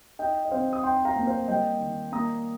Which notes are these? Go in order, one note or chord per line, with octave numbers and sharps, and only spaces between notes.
D#4 D#5 G5
D#5
C4 C5 F5
D#6
D#4 G5 C6
F5 A#5
A#3
C5 F5
G3 D#5 G5
D#3
A#3 A#5 D#6